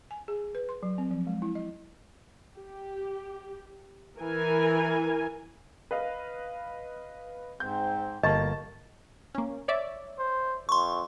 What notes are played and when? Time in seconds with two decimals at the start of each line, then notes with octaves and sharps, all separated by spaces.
0.11 G#5
0.28 G#4
0.55 B4
0.69 C6
0.83 F#3
0.98 C4
1.11 F3
1.27 G#3
1.42 E4
1.55 D#5
2.56 G4
4.19 E3 A#4 G#5
5.91 B4 D#5 F5
7.60 G#2 C4 G6
8.23 G1 D2 A#3 D#5 A5 C#6
9.35 A#3 C#4
9.68 C#5 D5 E5
10.19 C5
10.69 F2 C6 C#6